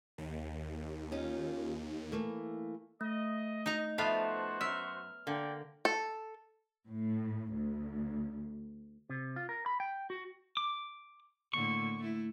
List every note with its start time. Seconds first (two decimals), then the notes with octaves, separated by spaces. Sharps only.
0.18 D#2
1.12 C#4 D#4 F4
2.12 E3 A3 A#3
3.01 A3 D#5
3.66 D#4 A#5
3.98 F3 A3 B3 F#4 B4 C5 F5 A5
4.61 F#2 E5 F6
5.27 D3 A#3 D5 G5
5.85 A4
6.89 A2
7.53 D2
9.09 C3
9.36 F4
9.49 A#4
9.66 B5
9.80 G5
10.10 F#4
10.57 D6
11.54 A2 D3 A#3 C#6
11.99 A3 E4